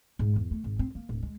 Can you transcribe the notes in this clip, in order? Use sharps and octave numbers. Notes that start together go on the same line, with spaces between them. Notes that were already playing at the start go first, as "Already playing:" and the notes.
G#2
E2
A3
G#1
C4
A#3
D1
G#3